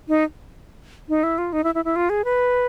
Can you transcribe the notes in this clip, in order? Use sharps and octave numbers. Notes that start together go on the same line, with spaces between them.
D#4
D#4
E4
F4
D#4
E4
E4
E4
F4
G#4
B4